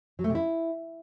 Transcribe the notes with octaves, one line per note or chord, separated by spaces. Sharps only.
F#3
A3
C3
E4